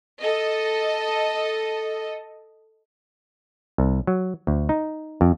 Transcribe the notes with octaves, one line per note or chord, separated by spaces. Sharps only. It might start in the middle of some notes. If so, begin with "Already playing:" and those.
A4 D#5
C2
F#3
D2
D#4
F2